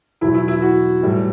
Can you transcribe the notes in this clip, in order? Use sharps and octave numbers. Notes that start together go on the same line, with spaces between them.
E2 B2 F#3 E4
E4
E4
F#4
A2 E3 G3